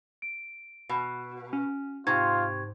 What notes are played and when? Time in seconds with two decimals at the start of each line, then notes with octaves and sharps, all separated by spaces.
0.22 D7
0.89 B2
1.53 C#4
2.07 G#2 C3 F4 C#6 G#6